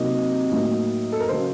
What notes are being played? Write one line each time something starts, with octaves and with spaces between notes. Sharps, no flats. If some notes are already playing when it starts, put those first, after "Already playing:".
Already playing: C3 F#3 A#3 D#4 D#5
A2 F#3 A#3 D#4
A4
A#4
C#3 F#3 C5